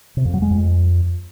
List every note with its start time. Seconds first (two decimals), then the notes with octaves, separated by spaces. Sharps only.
0.17 C3
0.25 F2
0.34 F#3
0.42 G#3
0.50 F2